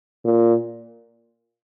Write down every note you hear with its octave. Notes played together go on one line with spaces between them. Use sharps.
A#2